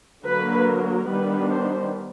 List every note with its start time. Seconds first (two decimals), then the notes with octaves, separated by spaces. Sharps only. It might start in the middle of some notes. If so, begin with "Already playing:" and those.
0.24 D3 F#3 A#3 B4
0.66 A#4
1.07 D#3 G3 B3 D4 B4
1.49 C5